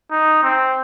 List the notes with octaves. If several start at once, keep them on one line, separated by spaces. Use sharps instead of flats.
D#4
C4